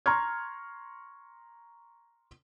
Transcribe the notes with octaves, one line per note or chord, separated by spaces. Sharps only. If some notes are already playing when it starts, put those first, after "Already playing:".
A#5 C6 C#6 F6 G#6